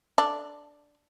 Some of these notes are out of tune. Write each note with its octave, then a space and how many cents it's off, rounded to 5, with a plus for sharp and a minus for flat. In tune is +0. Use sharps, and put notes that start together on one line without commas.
D4 +0 A4 +0